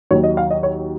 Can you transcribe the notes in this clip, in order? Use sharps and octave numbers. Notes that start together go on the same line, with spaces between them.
D#2 D#3 F#3 C#5
D#5
F5
D#5
C#5